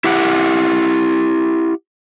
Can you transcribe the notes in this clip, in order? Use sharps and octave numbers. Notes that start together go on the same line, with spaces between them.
E4 G4 F#5